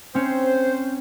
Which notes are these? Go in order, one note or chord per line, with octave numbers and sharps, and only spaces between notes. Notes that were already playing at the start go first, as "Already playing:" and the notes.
C4 C#4 C5